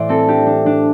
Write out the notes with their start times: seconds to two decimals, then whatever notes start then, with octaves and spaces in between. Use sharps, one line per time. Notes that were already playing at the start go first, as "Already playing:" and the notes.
Already playing: A2 E3 C5 D5 E5
0.09 C4 A4
0.28 D4 G4
0.47 D4
0.66 D4